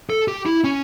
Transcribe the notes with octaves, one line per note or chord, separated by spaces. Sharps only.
A4
G4
E4
C#4